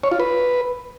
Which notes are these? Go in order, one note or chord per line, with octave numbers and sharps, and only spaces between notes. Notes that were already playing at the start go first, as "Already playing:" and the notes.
C#5
F4
B4